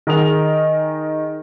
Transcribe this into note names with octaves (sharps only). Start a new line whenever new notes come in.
D#3 G#4 A#4 D#5 F7